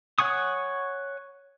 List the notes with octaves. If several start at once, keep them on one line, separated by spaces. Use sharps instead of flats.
C#5 F#5 G#5 C#6 D#6